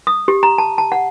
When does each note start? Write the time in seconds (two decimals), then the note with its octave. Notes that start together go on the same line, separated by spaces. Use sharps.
0.07 D#6
0.28 G4
0.43 A#5
0.58 A5
0.78 A5
0.92 F#5